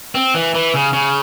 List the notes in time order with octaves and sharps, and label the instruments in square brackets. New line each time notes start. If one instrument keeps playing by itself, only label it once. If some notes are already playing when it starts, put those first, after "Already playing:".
[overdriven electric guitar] C4
E3
E3
C#3
C#3